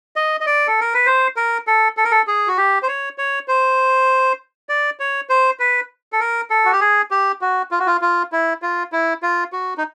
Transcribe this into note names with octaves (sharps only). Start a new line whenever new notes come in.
D#5
D#5
D5
A4
A#4
B4
C5
A#4
A4
A4
A#4
A4
G#4
F#4
G4
C5
C#5
C#5
C5
D5
C#5
C5
B4
A4
A#4
A4
F#4
G4
G#4
G4
F#4
F4
F#4
F4
F4
E4
F4
E4
F4
F#4
D#4